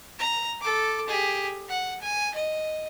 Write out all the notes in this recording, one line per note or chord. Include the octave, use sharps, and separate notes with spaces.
A#5
A4 D6
G4 G#4
F#5
G#5
D#5